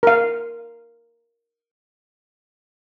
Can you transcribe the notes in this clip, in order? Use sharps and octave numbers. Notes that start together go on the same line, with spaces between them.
A#4 F5